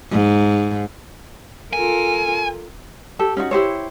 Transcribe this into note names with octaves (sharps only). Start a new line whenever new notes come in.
G#2
F4 A4 A#4 G#5
G4 A4
C#4 D#4 F4 F#4
E4 G4 C5 C#5